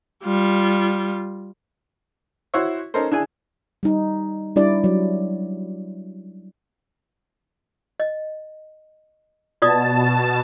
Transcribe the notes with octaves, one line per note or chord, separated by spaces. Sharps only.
G3 F4
E4 F#4 C5 C#5 E5
C#4 D#4 A4 A#4 C5
D4 E4 G#4 G#5
G3 D#4
G3 D4 E4 D5
F#3
D#5
B2 F4 D5 A5 D#6